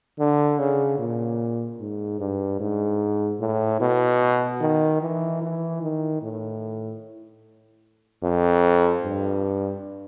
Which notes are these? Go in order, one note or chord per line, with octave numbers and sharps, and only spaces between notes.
D3
C#3
A#2
G#2
G2
G#2
A2
B2
D#3
E3
E3
D#3
A2
F2
G2